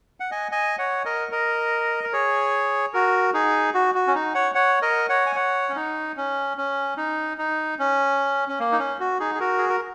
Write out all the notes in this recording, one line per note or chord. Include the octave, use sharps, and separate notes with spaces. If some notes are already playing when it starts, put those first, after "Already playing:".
F#5
D#5 G#5
D#5 G#5
C#5 F#5
A#4 D#5
A#4 D#5
A#4
G#4 C#5
F#4 A#4
D#4 G#4
F#4
F#4
C#4
D#4
C#5 F#5
C#5 F#5
A#4 D#5
C#5 F#5
G#5
C#5 F#5
C#4
D#4
C#4
C#4
D#4
D#4
C#4
C#4
A#3
D#4
C#4
F#4
D#4 G#4
G#4
F#4 A#4
G#4
A#4